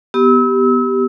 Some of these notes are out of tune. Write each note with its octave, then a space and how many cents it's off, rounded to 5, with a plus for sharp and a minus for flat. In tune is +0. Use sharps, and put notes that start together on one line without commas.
B3 +0 G4 -10 E6 -35